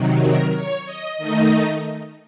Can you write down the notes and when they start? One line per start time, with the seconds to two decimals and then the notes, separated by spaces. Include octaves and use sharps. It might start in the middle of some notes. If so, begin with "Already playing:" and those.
Already playing: C3 D#3 F#3
0.21 A#4
0.54 C#5
0.85 D#5
1.18 D#3 A3 D#4 D#5